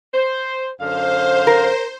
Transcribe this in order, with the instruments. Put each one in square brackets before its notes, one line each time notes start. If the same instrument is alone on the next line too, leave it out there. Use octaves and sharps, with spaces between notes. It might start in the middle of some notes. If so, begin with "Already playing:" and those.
[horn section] C5
[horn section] F#2 D3 F5 [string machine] C5
[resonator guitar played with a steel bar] A#4